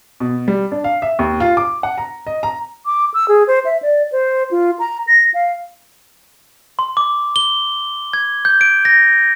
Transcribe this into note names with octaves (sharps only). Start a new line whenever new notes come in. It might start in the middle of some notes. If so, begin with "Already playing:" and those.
B2
G3
D4
F5
E5
D#2
F4
D6
F#5
A#5
D#5
A#5
D6
E6
G#4
C5
E5
D5
C5
F4
A#5
A#6
F5
C6
D6
G7
G#6
G6
D7
A#6